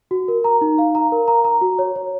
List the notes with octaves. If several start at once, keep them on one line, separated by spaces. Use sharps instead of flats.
F#4
A#4
A#5
D#4
F5
A#5
A#4
A#5
A#5
F#4
C#5
C#5